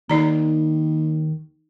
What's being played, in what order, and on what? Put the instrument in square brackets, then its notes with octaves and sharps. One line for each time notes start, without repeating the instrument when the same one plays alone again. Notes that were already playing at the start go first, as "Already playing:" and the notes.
[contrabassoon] D#2 [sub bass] D#3 [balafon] D#4 D5 A#5